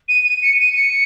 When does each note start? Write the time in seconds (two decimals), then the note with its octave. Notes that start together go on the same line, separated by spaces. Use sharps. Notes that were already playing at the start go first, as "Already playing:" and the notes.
0.09 D#7
0.25 D#7
0.42 C#7
0.58 D#7
0.75 C#7